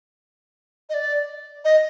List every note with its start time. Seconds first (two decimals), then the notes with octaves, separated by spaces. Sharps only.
0.89 D#5
0.94 D5
1.65 D#5